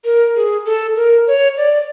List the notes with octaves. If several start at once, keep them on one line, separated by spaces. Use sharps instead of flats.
A#4
G#4
A4
A#4
C#5
D5